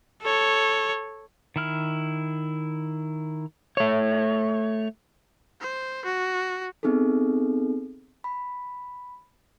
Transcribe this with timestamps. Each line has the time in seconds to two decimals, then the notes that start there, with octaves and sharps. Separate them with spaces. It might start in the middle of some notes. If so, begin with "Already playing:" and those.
0.22 A4 C#5
1.56 D#3 E4 F6
3.77 A3 C#5
5.61 C5
6.05 F#4
6.83 B3 C4 D#4 G#4 A4
8.24 B5